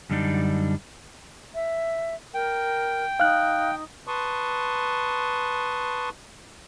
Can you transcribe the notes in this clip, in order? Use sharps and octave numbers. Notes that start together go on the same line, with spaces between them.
F#2 D3 G3 D4 D#4
E5
A#4 G5
D#4 F5 F#6
B4 A5 C6 C#6 D#6